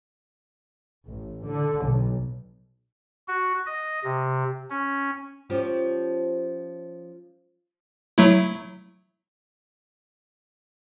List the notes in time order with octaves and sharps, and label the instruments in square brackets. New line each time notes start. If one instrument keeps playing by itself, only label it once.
[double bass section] A1
D3
B1
[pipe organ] F#4
D#5
C3
C#4
[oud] F3 C#4 G4
[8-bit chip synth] F#3 A3 E4